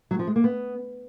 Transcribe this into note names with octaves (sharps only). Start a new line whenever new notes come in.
F#3
F3
G#3
A#3
B3